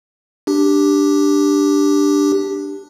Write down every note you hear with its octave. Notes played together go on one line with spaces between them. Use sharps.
D4 G4